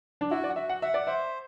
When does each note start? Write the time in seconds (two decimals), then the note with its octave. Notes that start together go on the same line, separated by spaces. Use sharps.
0.21 D4
0.31 E4 F#4
0.44 D5
0.50 F#5
0.56 F#4 E5
0.69 F#5
0.82 E5 F#5
0.94 D5
1.07 C5 E5